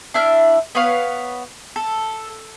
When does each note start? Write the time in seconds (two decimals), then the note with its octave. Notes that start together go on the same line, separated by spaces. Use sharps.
0.14 D4 E4 E5 F6
0.75 B3 B4 C#5 F5
1.76 A4